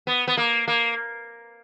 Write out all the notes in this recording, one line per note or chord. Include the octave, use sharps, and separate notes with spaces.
B3
B3
A#3
A#3